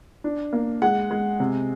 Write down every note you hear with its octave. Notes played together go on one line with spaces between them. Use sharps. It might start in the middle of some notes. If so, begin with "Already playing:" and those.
D4
A#3
G#3 F#5
G#3
C3